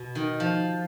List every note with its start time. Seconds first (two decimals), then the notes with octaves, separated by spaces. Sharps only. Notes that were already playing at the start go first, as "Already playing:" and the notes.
Already playing: B2
0.15 D#3
0.40 F3